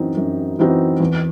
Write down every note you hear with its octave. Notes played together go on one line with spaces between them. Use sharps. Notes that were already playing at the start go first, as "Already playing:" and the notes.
Already playing: F#2 E3 C4 D#4 F#4
F#2
E3 C4 D#4 F#4
E2